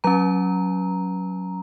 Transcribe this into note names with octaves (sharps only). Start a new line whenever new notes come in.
F#3 C#4 A#5